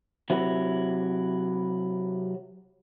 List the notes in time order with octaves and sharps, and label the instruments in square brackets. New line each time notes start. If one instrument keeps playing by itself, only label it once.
[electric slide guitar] C3 F#3 E4